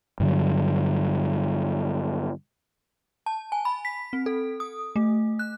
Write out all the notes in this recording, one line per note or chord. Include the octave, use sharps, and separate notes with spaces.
G2 D3 F#3
A5
G#5
B5
B6
C4
A4
D#6
A3
F#6